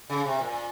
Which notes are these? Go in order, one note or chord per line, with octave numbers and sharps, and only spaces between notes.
C#3
C3
A#2